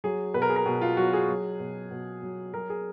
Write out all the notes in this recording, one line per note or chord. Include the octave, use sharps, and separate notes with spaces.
F#3 G#4
B2 B4
A#4
G#4
A#4
B2 G#4
F4
F#3 F#4
G#4
F#3
B2
B2
F#3
F#3 A#4
G#4